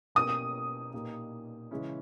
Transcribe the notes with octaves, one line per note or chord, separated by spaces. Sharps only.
B2 A#3 C#4 G4 A#4 D#6
A#2 A#3 D#4 G4
C#3 E3 G#3 C#4 E4